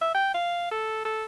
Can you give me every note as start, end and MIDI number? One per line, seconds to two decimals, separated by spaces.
0.02 0.11 76
0.15 0.30 79
0.34 0.68 77
0.71 1.03 69
1.05 1.25 69